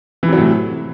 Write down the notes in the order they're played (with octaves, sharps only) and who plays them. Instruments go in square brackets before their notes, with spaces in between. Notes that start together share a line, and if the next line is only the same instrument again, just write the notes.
[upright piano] E3
C3
F#3
A2